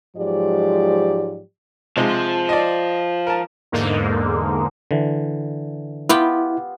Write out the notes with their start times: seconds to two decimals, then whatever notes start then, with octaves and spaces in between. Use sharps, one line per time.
0.17 G#2 F3 F#3 G#3 G4 D5
1.97 C3 F3 G#3
2.49 D5 D#5
3.27 A#4 A5
3.72 E2 G#2 D3 A#3 D#4
4.91 D3 E3
6.09 B3 E4 F4 G4